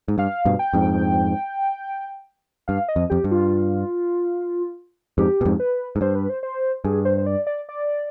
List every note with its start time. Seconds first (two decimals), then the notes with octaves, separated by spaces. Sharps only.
0.08 G#2
0.18 G2 F5
0.45 G2 B2
0.59 G5
0.73 F2 G#2
2.68 G2 F5
2.89 D#5
2.96 F2
3.10 F2 G4
3.24 G2
3.31 F4
5.18 F2 G#2 G4
5.41 B2
5.45 F2 G#2
5.60 B4
5.96 G#2
6.01 G2 C5
6.15 B4
6.30 C5
6.43 C5
6.84 G2 G#4
7.05 C5
7.18 C5
7.27 D5
7.47 D5
7.69 D5